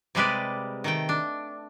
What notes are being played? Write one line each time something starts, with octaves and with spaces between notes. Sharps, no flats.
C3 G3 G#3 B4 D5
D#3 A3 G5
D4